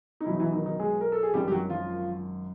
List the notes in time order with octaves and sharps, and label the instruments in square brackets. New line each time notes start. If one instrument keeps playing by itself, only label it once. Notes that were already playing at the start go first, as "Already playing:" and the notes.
[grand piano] D#4
B1 B2 E3 F#3 E4
D#4
E3 E4
D#3 D#4
D#3 D#4
G#3 G#4
A#4
A4
G#4
G#1 F#2 D#3 G3 G4
G4
F#3 F#4
F3 F4